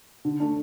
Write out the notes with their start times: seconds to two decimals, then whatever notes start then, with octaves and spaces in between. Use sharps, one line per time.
0.25 D3
0.40 A3 D4